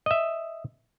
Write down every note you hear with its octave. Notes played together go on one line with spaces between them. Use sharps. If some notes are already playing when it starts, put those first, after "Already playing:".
D#5 E5